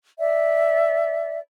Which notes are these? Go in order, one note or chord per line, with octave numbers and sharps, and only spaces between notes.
D5 E5